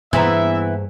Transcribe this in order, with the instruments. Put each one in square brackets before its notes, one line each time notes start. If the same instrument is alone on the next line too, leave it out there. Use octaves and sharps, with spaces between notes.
[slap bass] G2 A#3 [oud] E3 B3 [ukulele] G#4 C5 A#5 [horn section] E5